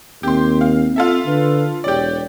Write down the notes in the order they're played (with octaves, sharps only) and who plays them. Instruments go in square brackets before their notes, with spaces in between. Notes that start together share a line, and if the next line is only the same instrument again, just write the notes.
[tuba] D#2 [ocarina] C4 [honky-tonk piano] G4 C6
[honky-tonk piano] F5
F4 A4 E5
[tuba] D3 [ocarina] B4
[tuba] E1 [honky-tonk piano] G4 D5 [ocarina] C#5